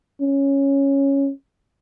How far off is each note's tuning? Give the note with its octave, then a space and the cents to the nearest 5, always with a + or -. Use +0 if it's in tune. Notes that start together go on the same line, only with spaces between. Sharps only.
C#4 -5